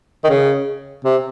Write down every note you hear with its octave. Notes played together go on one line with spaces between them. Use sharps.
D#3
C#3
C3